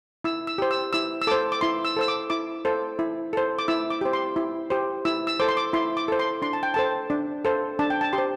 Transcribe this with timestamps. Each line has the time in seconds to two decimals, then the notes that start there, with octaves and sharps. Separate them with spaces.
0.24 E4 E6
0.47 E6
0.58 G4 C5
0.71 E6
0.93 E4 E6
1.22 E6
1.27 A4 C5 D6
1.52 D6
1.61 E4 C6
1.85 E6
1.97 A4 C5 E6
2.08 D6
2.30 E4 D6
2.65 A4 C5
2.99 E4
3.33 A4 C5
3.59 D6
3.68 E4 E6
3.90 D6
4.01 G4 C5
4.13 C6
4.36 E4
4.70 G4 C5
5.05 E4 E6
5.27 E6
5.40 A4 C5 D6
5.49 C6
5.57 D6
5.73 E4 C6
5.97 D6
6.08 A4 C5
6.19 C6
6.42 D4 C6
6.53 A5
6.63 G5
6.74 A4 C5 A5
7.10 D4
7.45 A4 C5
7.79 D4 A5
7.90 G5
8.01 A5
8.13 G4 C6
8.18 C5